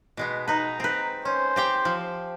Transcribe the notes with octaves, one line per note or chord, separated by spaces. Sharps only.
B2 G#3 B3
D#4 B4 A#5
C4 B4
C#4 C5
C4 G4 G5
F3